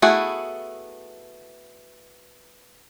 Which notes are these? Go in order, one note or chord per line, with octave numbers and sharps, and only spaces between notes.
A3 B3 E4 F#4 G#4